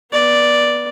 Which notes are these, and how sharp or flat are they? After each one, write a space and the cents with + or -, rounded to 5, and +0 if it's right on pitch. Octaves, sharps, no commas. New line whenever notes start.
B3 -25 D5 +0